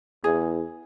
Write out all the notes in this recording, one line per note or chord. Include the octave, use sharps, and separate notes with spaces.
E2 G#4